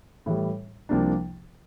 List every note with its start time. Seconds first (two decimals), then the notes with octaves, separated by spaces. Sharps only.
0.26 A2 E3 G3
0.89 C2 C3 F3 A#3 D4